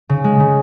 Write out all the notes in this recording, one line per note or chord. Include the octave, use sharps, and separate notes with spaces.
C#3
G#3
C#3